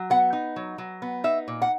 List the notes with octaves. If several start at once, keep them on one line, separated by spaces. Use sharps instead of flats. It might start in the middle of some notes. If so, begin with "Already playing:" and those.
Already playing: F#3
B3 F#5
D#4
F#3
F#3
B3
D#4 E5
A#2
F#5